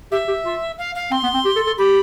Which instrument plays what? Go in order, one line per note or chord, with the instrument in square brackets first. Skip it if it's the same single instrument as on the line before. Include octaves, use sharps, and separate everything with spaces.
[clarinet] G4 [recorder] E5
[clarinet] G4
F4
[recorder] F5
F5
[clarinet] C4 [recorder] C6
[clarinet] B3
C4
G4
A4
A4
[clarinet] G4 [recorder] B5